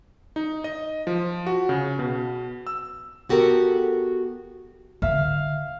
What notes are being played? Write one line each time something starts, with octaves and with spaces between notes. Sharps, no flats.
D#4
D#5
F3
F#4
C#3
B2
E6
B3 F#4 G4 A4 A#4
D3 E5 F5